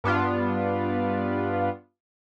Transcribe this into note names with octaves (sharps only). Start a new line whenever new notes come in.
G2 B3 D4 F4